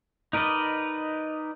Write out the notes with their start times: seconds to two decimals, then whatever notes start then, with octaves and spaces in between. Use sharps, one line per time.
0.33 D#4 A#4 B4 D5 D#5